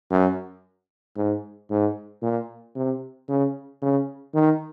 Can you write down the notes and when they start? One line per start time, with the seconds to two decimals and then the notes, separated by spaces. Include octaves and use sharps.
0.11 F#2
1.16 G#2
1.70 G#2
2.22 A#2
2.75 C3
3.29 C#3
3.82 C#3
4.34 D#3